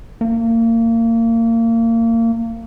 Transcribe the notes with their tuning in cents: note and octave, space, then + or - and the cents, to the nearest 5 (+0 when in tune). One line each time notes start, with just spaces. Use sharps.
A#3 -30